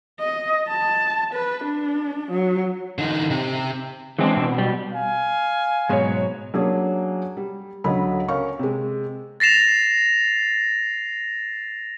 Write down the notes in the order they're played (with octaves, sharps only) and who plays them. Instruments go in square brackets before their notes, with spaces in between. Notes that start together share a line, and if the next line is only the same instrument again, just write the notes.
[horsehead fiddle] D#5
A5
B4
D4
F#3
[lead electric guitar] D3 D#4
C3
[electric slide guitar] E3 C4 D4 [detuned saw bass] G#3
[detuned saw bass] B2
[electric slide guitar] G3
[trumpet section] F5 G#5
[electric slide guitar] G#2 B2 F#3 [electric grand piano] G#3 C#5
[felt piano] F#3 A#3 C#4 D4 G#4 C#5
G3
C#2 D3 F#3 D#5 B5
C#4 A#4 F5 C#6
C3 G#3
[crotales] A6 A#6 C7 E7 F7